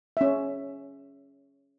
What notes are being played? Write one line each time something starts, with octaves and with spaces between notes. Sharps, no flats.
C#4 E5